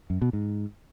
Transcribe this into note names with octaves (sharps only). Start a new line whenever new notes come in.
F#2
B2
G#2